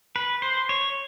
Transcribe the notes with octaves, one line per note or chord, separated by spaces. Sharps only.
B4
C5
C#5